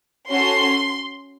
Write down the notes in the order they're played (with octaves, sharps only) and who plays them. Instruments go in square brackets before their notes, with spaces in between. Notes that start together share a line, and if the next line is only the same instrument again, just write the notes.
[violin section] C#4 F#4 A4 C6